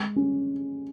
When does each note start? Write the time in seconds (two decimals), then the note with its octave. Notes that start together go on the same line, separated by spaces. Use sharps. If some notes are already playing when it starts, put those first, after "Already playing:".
Already playing: G#3
0.16 C#4